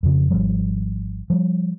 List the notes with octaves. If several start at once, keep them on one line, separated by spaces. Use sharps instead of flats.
F2 C#3
G#1 F2 F3 G3
F3 G3